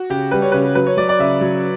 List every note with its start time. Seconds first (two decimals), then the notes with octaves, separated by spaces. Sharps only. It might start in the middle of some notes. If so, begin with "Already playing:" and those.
Already playing: F#4
0.10 C#3 G4
0.31 G3 B4
0.42 C#5
0.52 C#3 B4
0.75 F#3 B4
0.87 C#5
0.97 F#3 D5
1.09 D5
1.19 C#3 E5
1.41 F#3